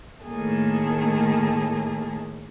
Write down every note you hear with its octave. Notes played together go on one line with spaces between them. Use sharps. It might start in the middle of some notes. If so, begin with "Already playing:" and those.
A2 D#3 A3 A#3 G#4 A4